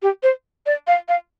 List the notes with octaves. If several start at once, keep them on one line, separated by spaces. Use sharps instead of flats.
G4
C5
D5
F5
F5